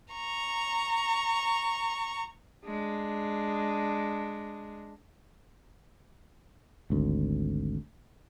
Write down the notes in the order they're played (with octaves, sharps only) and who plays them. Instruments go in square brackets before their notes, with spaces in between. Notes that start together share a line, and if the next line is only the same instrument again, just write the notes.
[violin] A#5 C#6
[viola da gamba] G#3 D4
[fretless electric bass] G#1 D2